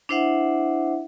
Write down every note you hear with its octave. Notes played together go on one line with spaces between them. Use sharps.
D4 E4 C5 E5 F#5